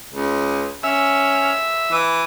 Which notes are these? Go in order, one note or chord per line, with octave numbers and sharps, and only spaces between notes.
C#2
C#4 E5
E3